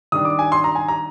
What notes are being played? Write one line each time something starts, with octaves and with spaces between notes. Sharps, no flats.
D#3 G3 D4 D#6
D6
G#5
C6
A#5
G#5
A#5